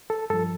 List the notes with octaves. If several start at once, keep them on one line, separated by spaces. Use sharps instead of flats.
A4
G2 F3 A4